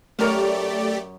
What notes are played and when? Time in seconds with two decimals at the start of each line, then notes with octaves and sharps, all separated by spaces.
0.19 F#2 A3 G4 A#4 C#5 D5